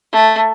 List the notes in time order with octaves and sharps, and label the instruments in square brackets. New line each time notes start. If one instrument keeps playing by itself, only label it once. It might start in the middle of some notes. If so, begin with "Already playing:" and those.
[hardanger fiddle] A3